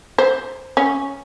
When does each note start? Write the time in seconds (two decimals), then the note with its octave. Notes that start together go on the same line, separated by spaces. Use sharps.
0.18 C5
0.77 C#4